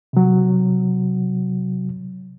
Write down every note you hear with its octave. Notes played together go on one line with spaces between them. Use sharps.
C3 F#3